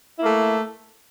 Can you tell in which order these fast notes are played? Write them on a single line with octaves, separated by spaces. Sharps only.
E4 A#3 A3